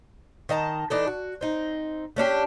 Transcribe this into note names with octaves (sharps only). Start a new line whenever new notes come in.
D#3 D#5 A5 A#5
E3 D4 D#4 A4
F#4
C4 D#4
A3 C#4 D4 G4